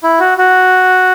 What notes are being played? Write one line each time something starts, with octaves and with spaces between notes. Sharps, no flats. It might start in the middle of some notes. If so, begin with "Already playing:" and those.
E4
F#4
F#4